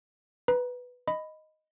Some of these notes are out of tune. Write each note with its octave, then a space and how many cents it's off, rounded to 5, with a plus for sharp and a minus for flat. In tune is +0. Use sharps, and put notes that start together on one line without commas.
B4 +0 A#5 +30
D#5 +0 B5 +10